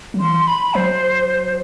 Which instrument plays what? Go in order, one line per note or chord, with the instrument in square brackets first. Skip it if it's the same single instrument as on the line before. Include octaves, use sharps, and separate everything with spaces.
[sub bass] F#3
[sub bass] E3 [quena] C6
[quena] B5
[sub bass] F#3 [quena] C5